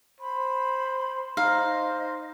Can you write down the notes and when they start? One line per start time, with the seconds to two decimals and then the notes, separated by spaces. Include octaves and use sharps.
0.21 C5 B5
1.37 D#4 C5 D#5 F5